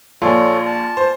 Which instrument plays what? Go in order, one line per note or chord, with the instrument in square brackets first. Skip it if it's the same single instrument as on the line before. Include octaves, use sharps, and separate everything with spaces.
[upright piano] A#1 [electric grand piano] F4 D5 G#5 [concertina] A4 C#5
[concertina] A5
[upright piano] C5